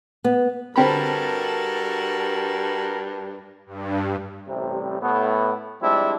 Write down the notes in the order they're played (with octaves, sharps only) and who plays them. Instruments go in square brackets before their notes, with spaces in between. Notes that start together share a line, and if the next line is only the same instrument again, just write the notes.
[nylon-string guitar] B3
[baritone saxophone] G2 [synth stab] D3 C4 B5 [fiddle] F#4 A4 [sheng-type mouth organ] A#4
[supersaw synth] G2
[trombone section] A1 C3 G3
A2 B3
F3 G3 G#3 C4 D4 E4